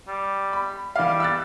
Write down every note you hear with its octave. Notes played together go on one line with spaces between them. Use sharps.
G3
B5
E3 G3 F5
E6 F#6 A6